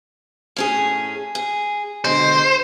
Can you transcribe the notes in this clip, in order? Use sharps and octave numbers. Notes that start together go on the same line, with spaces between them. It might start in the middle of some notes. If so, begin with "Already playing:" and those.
A2 C#4 G#4
G#4
B2 D3 G#3 C5